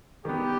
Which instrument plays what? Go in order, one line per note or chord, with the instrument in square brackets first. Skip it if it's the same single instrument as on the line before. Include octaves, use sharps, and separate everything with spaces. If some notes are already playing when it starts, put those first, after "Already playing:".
[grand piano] D#3 G3 B3 [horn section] G4